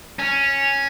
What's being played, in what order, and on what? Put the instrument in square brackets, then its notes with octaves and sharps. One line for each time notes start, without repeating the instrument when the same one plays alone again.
[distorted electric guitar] C#4